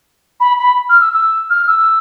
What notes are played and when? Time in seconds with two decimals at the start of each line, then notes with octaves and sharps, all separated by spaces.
0.40 B5
0.59 B5
0.89 F6
1.01 E6
1.13 E6
1.50 F6
1.67 E6